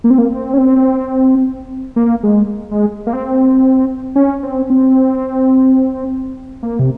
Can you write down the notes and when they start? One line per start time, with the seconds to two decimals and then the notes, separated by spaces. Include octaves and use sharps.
0.04 A#3
0.10 C4
0.18 A#3
0.32 C4
0.54 C#4
0.58 C4
1.96 A#3
2.23 G#3
2.71 G#3
3.07 A#3
3.13 C4
4.16 C#4
4.43 C4
4.70 C4
6.63 A#3
6.79 C3